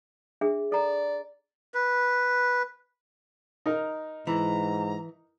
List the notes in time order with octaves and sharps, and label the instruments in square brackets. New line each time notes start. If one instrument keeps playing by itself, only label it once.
[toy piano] D4 G#4 E5
[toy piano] A4 A#5 [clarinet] D5
[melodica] B4
[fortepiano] D#4 A#4
[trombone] G#2 [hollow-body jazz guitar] E3 [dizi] A#5